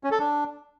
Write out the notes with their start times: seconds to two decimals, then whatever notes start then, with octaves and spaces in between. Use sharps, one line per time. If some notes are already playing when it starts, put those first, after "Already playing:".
0.04 C#4
0.12 A4
0.19 D4